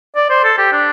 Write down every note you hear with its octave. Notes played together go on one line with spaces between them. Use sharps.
D5
C5
A4
G4
D4